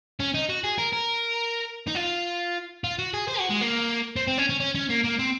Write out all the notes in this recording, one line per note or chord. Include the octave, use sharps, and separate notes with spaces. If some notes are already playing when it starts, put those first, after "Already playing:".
C#4
D#4
F#4
G#4
A#4
A#4
D#4
F4
F4
F#4
G#4
C5
F#4
G#3
A#3
C4
C4
C#4
C#4
C#4
C#4
A#3
A#3
C4